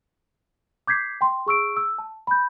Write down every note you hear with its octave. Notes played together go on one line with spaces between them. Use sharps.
D6 G6 G#6 B6 C7
G5 C6
G#4 C#6 E6 D7
E6
A5
B5 G6